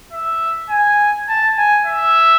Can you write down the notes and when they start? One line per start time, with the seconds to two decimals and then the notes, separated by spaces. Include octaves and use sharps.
0.13 E5
0.70 G#5
1.28 A5
1.58 G#5
1.86 E5